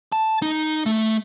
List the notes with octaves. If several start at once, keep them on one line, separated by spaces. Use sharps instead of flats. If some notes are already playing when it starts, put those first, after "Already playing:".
A5
D#4
A3